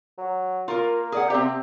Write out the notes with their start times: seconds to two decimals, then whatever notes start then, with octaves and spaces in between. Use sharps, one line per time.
0.18 F#3
0.68 A#3 F4 A#4
1.12 G#4 D5 F#5
1.30 C3 C4 G4